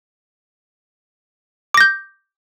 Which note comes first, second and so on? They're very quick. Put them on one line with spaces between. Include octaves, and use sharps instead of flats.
D6 A#6 G6